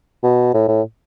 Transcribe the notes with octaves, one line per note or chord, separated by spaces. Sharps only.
B2
A2
A2